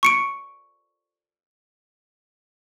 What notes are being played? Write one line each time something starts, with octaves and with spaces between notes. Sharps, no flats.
C#6 C#7 D7